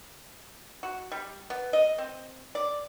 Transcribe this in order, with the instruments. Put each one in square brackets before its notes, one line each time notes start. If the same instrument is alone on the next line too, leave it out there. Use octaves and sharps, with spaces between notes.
[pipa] F#4
G3
B3
D#5
C4
D5